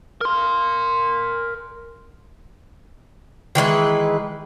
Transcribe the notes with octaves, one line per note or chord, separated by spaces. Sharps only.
A#4 C6
D#3 E3 G#3 B4